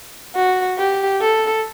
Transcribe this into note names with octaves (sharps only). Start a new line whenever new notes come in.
F#4
G4
A4